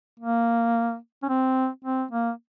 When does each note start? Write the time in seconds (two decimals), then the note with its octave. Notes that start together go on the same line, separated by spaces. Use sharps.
0.19 A#3
1.23 C#4
1.29 C4
1.84 C4
2.11 A#3